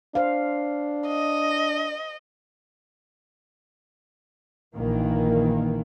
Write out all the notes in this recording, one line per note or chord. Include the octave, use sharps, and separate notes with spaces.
D4 C5 F5
D#5
A#1 D#3 E3 A#3